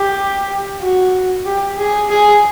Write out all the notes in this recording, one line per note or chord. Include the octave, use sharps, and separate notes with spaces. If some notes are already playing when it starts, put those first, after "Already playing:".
Already playing: G4
F#4
G4
G#4
G#4